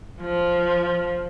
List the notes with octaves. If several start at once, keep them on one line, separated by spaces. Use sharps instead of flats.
F3